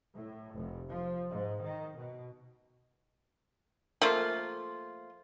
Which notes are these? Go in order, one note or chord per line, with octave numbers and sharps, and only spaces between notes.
A2
F1
F3
G#2
D#3
B2
F3 A3 A#3 F4